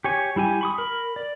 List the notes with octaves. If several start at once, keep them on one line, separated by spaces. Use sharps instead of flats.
G4 C#5 G#5
G3 E4 G4 G#5
B5 C#6 D#6
A#4 B5
D5